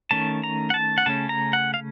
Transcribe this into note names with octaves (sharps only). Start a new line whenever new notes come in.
D#3 A3 C#4 A5
A#5
F#5
A5
F#5
C#3 A3 C#4 A5
A#5
F#5
F5